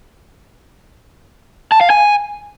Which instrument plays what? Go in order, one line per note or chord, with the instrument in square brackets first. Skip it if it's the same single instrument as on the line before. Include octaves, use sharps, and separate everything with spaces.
[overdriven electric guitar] A5
F5
G#5